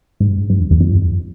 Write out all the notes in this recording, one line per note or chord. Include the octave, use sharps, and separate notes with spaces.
G#2
G2
G2
E2
E2
F2
G2
F2